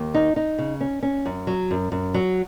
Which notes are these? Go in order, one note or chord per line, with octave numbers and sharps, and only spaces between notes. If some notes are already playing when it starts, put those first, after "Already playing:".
Already playing: D#2
D#4
D#4
C#3
C#4
C#4
F#2
F#3
F#2
F#2
F#3